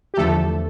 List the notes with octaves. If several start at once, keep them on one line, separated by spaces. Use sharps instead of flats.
G4
E2 D3 F3 A3 A4